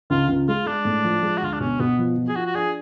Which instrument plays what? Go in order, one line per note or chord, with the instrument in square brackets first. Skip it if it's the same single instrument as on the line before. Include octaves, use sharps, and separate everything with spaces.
[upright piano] C#2 [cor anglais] F4
[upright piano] C#2
[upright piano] G#3 [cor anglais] F4
[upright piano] G#3 [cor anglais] D4
[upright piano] A2
F3
G#3
[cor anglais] F#4
[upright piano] D2 [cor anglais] F4
[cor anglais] D4
[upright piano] B2 [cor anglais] C#4
[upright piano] B2 [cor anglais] B3
[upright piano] F3
F3
[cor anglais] G#4
[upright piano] F4 [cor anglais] F#4
[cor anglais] F#4
[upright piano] D4 [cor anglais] G#4